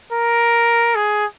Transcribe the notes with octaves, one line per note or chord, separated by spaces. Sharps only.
A#4
G#4